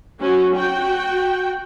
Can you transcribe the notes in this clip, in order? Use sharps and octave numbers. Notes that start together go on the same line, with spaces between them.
F#3 C#4 F#4
F#4 G5